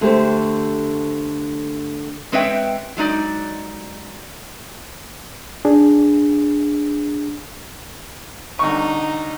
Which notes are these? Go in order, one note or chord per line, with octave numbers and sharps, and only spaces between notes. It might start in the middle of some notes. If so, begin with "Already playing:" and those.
D3 A3 G4 C5
G#3 C4 B4 C#5 E5 G5
F#3 G#3 D#4 D5
D4 G#4
C2 D3 D#4 C#6